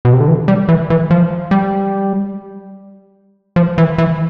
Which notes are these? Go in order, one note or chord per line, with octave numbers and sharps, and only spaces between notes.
B2
C3
D3
E3
G3
E3
E3
F3
G3
F3
E3
E3